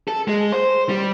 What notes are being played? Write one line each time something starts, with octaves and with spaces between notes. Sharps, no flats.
A4
G#3
C5
G3